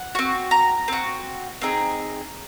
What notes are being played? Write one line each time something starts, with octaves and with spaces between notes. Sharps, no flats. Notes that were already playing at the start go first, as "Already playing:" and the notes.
Already playing: F#5
C4 F#4
A#5
C4 F#4
C4 D#4 G#4